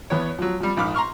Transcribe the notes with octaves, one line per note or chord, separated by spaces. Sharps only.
E2 B3 C#5
F3 F#3
F3 G3
A#1 G#2 B5 D6 F6
A#5 C6 C#6 F6